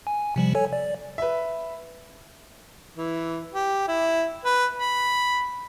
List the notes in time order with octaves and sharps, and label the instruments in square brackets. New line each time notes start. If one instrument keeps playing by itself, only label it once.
[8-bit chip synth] G#5
C3 F3 G3
A4 C#5 G#5
D5
[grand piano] B4 E5
[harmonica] E3
G4
E4
B4
B5